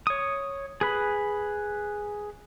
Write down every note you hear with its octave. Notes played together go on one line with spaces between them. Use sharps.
C#5 D#6
G#4 B4 B5